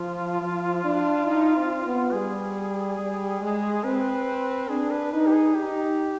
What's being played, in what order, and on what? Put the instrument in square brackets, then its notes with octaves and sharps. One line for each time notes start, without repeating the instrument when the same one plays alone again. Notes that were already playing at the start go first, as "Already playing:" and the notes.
Already playing: [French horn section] F3 [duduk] F4
[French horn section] F3
D4
D#4
C4
B3
[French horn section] G3 [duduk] G#4
[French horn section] G3
G#3
[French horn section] C4 [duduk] B4
[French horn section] D4 [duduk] G#4
[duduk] B4
[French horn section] D#4 [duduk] B4
[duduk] G4
G#4
[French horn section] D#4 [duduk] G4